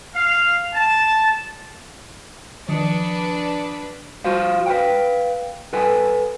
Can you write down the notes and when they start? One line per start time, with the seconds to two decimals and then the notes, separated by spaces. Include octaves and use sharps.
0.15 F5
0.74 A5
2.69 D#3 F3 D4 B4 D#6 C#7
4.24 F4 F#4 C5 F5
4.66 B4 F5 G5
5.73 A4 B4 F#5 G#5